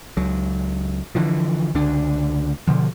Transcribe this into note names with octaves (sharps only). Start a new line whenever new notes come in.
C#2 F#3
D3 E3 F3
C#2 D3 D4
B2 D3 F3